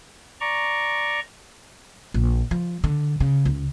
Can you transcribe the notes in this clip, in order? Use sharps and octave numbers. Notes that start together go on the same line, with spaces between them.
D5 A#5 C#6
A#1
F3
D3
C#3
C#2